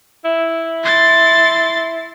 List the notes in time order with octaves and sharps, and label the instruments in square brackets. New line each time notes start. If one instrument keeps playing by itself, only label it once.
[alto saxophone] E4
[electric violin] C6 A6